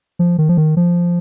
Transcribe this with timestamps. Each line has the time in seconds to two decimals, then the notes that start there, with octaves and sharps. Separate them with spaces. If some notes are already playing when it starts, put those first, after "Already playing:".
0.19 F3
0.38 D#3
0.49 F3
0.57 D#3
0.77 F3